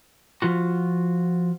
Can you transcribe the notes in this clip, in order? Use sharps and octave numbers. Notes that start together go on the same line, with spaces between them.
F3 F4 F#4